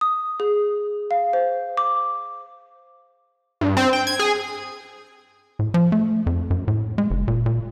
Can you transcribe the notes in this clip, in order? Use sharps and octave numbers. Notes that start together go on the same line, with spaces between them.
D#6
G#4
F5
C5
D6
G2
C4
G5
G#6
G#4
A2
F3
A3
F2
F#2
A2
G#3
F#1
A#2
A#2